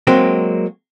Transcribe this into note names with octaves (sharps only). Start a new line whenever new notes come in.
F#3 G#3 A#3 C4